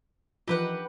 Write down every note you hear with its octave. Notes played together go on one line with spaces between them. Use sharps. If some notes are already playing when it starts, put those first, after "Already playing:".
E3 F3 F4 G4 B4 F#5